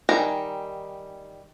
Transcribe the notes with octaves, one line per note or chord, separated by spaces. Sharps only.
D#3 G3 G#5 A#5